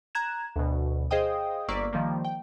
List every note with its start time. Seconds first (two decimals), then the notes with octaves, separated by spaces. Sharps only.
0.15 A#5 F#6 G#6 E7
0.56 D2 B2
1.11 G#4 C5 D#5 F5 G5 D#6
1.68 G1 A#3 D5 C#6 E6 B6
1.93 D#3 F3 G3 A#3
2.24 G5